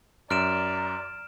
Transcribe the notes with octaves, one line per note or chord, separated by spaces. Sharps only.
F#2 D5 A#5 F6 D7 E7